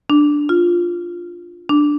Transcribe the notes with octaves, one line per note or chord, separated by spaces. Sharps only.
D4
F4
D4